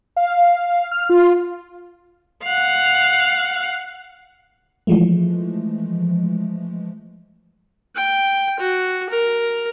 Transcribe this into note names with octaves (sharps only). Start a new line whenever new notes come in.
F5
F6
F4
F5 F#5
E3 F3 G#3 A3
G5
F#4
A#4